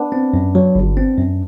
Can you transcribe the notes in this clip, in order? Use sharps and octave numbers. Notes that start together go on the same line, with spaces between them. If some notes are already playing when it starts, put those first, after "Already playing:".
Already playing: B3 D4
C4
F#2
F#3
G1
C4
F#2